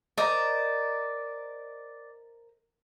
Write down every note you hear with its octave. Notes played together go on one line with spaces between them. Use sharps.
A#4 C5 D5 D#5 A#5